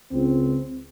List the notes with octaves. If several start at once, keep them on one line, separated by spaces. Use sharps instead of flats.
C#2 C4